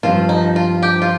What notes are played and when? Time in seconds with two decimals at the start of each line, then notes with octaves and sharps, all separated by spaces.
0.03 G2 F3 C4 F4
0.29 D#4
0.56 F4
0.83 G4
1.02 F4